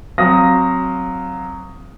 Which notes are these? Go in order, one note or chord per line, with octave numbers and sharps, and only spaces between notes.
F#3 C4 F5 D#6 A#6